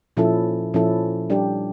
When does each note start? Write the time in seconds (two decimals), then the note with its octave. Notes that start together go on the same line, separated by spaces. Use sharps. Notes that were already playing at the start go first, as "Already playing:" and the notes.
0.17 A#2 F3 C#4 E4 A4
0.74 A#2 F3 C#4 E4 A4
1.30 G3 D4 G4